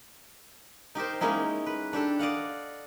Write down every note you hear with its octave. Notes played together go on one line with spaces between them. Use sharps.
D#4 G4 A#4 C5
G#3 A#3 C#4 D#4 E4
B4
D4 G4 A4
D5 D#5 F5 F#5